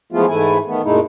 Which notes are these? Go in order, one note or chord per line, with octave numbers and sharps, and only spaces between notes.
E3 F3 G#3 A3 B3 F4
G#2 E3 A3 E4 G#5
D#3 A3 B3
F#2 A#2 G#3 A3 D#4 E4